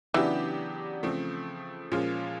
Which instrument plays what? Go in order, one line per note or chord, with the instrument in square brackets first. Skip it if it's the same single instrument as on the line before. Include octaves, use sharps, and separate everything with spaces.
[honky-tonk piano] C#3 F#3 B3 D4 G4 [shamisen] E3
[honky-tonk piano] C#3 F3 A3 C4
A#2 F3 G#3 C#4 F4